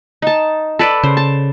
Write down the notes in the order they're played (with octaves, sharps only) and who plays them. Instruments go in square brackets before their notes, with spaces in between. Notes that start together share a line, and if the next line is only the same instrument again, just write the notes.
[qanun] D#4 A5
A4 B4 D5
[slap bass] C#3 [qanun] C5
[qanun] A5